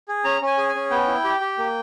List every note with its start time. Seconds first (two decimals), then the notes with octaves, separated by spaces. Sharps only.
0.08 G#4
0.24 C#4 A#5
0.42 C#4
0.47 G#5
0.58 G#4
0.69 G#5
0.75 C#4
0.91 B3 G5
1.07 E4
1.24 G4
1.41 G4
1.58 A#3